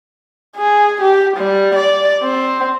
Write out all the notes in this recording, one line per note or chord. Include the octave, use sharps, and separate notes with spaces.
G#4
G4
G3
D5
C4